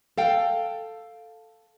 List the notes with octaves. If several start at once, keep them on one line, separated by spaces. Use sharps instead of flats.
A4 F5 G5